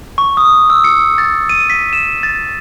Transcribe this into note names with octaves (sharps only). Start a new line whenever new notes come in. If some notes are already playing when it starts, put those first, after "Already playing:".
C#6
D#6
E6
C#7
A6
D#7
B6
E7
A6